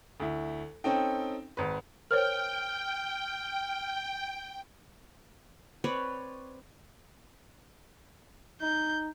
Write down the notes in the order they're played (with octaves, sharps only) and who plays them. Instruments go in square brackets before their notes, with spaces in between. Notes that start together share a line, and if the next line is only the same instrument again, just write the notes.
[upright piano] D2 E4
C4 C#4 D#4 A4 G5
G#1 B4
[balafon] A#4 C5 C#5 [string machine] G5 [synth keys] F6
[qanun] C4 B4 C#5 D5
[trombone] D#4 [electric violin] G6